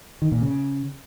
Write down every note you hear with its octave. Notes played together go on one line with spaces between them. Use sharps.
D#3
A#2
C#3